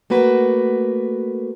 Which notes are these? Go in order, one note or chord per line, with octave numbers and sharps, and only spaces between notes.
A3 A#3 F#4 B4